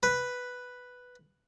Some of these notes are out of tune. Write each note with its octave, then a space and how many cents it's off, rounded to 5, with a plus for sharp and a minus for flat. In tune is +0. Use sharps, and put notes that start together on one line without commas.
B4 +0